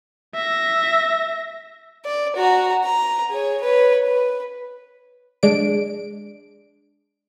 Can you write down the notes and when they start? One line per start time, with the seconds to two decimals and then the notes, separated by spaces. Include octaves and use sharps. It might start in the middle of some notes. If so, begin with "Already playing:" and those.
0.35 E5 A#6
2.05 D5
2.36 F#4 A#5
2.84 A#5
3.30 G#4 C#5
3.62 B4 C#5
4.07 B4
5.43 G#3 D4 D7